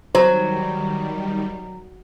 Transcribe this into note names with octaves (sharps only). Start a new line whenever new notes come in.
D#3 F#3 G3 C5